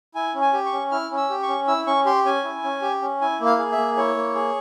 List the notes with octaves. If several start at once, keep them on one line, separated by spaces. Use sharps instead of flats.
E4 G#5
C#4
G#5
G4
C#6
C#4
E4 F6
C#4
E6
G4
C#6
C#4
E4 E6
C#4 C#6
G4 C6
C#4 G#5
E4
C#4
G4
C#4
E4 G#5
A#3
F5
G#4
E5
A#3
E4 C#5
A#3
G#4